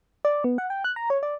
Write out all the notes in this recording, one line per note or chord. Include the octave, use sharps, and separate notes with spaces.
D5
B3
F#5
G5
F#6
A#5
C#5
D5